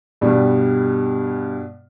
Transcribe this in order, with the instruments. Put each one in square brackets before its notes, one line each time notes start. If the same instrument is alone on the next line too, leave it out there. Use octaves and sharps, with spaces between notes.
[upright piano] G2 B2 G3